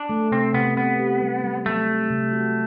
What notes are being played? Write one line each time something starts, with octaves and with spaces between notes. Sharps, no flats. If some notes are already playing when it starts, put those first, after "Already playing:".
Already playing: D4
A3
C3 C4
C3 B3
B3 C4
G4
G3
G3
F#3 A3
C4
C3
F#4